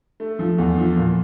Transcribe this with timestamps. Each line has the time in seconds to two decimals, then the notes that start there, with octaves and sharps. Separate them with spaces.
0.20 A3
0.39 F3
0.58 E2
0.78 F3
0.97 A#2